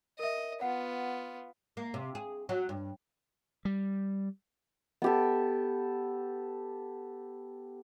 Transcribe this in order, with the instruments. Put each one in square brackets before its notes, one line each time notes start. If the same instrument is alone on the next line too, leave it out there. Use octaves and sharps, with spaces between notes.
[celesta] A#4 E5 [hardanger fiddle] D#5
[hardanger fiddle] B3 F4 [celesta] F#5
[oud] A#3
C3
G#4
F#3
G2
[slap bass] G3
[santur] B3 G4 A4